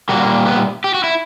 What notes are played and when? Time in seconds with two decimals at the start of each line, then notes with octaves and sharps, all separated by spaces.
0.09 A#2 G3 A#3 F#4
0.46 B3
0.84 G4
0.94 F#4
1.04 E4